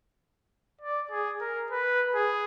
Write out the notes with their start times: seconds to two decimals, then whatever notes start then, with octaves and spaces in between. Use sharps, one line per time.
0.82 D5
1.11 G#4
1.41 A#4
1.71 B4
2.15 G#4